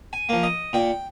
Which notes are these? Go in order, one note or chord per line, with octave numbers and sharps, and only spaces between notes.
G#5
F3 A#3
D#5
A#2 G5